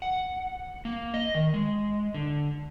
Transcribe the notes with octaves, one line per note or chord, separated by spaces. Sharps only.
F#5
A#3
D#5
D#3
G#3
D3